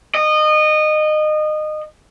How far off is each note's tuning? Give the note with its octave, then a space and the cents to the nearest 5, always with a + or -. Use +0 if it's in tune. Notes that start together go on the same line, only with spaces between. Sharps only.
D#5 -25